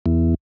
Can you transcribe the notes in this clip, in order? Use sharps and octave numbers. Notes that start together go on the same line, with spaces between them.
E2